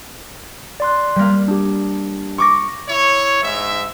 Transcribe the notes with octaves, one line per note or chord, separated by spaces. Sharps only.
D5 C6 F#6
G3 A#3
D4 G4
C#6 D6 A#6
E4 C#5
G#2 E5